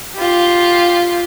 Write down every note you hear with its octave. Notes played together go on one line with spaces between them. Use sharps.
F4 G4